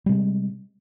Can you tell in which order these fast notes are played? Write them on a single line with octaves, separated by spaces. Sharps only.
G3 C3 G#3